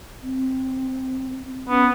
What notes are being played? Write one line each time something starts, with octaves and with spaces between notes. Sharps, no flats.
C4
B3 C#4